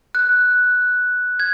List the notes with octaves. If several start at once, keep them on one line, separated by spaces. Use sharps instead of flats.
F#6
G#6